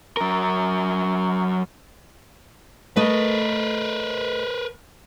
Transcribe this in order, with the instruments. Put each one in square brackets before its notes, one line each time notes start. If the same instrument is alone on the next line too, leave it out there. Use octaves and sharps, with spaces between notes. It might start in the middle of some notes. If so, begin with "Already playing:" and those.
[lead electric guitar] F#3 A#4
[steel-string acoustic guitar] A3 D#5 [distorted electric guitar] A#4 B4